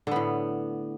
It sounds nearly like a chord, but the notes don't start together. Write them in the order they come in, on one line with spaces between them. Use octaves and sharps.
D3 B3 A2